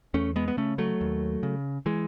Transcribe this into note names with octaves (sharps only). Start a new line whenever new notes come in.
E2 A3 C#4
G#3 B3
B3
C#3 A3 C#4
F#3 A3
D#2
C#3
E3 G#3